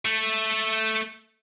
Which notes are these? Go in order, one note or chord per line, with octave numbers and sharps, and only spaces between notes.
A3